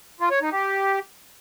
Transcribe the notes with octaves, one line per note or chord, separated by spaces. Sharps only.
F4
C#5
D#4
G4